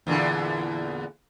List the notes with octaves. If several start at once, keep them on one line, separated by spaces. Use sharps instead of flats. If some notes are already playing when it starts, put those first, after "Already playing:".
E2 A#2 D3